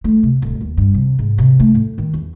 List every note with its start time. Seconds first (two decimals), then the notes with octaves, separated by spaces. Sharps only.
0.04 A3
0.23 C3
0.42 D1
0.61 D#2
0.77 G2
0.94 C3
1.19 G#2
1.38 C3
1.60 A3
1.75 A2
1.98 D#3
2.14 E2